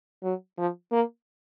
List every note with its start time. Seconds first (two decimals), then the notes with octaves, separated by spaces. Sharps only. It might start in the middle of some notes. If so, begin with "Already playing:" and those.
0.23 F#3
0.58 F3
0.92 A#3